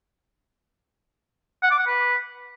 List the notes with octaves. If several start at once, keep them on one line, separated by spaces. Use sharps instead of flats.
F#5
D6
F#5
B4